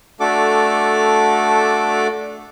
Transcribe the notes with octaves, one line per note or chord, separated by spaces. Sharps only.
A3 D4 F#4 A4 D6